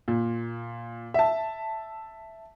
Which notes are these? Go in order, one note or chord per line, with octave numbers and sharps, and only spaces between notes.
A#2
E5 A5